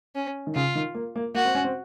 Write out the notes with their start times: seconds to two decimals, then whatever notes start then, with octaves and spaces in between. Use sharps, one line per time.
0.15 C#4
0.47 D#3
0.55 C#3 F4
0.75 D#3
0.95 A#3
1.16 A#3
1.34 A#3 F#4
1.45 C4
1.55 C#4
1.64 C4